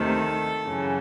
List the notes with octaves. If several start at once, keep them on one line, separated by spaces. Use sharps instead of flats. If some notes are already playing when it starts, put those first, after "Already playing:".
Already playing: D2 C3 D#3 A4
F#2 C#3 E3